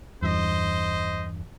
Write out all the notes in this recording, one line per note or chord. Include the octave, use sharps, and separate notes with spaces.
E2 G2 C5 D#5